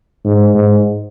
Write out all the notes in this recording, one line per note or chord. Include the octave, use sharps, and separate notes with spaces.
G#2
G#2